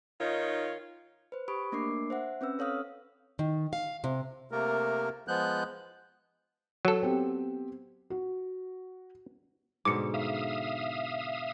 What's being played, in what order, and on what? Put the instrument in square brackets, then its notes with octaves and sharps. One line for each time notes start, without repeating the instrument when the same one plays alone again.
[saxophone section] D#3 D#4 F4 C#5
[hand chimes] B4 C5
G4 B5 C#6 D#6 D7
A3 A#3 D4 A#4 D6 C7
C5 E5 F#5
C4 C#4 B4 E6
A4 C#5 F5 D#6 F6
[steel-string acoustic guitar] D#3
F5
C3
[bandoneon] C3 A3 A#3 A#4
F3 G#3 B3 F#6 G6
[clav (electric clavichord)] F#3 A4
[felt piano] B3 C4 G4
F#4
[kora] G#2 B2 D3 [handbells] D6 C#7
[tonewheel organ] E5 F5 D#6